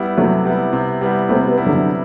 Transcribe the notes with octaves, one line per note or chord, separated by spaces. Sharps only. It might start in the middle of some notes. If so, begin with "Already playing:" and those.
Already playing: G3 B3 E4
C3 F#3 A3
G3 B3 E4
C3
G3 B3 E4
C3 A3 C4
G3 B3
G3 B3 E4
D3 F#3